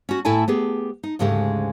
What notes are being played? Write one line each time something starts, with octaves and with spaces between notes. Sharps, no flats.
C#4 F#4
A2 A3 E4 A4 G#5 A5
B3 G4 G#4
D#4
D2 G#2 C#3 G#3 G4 A4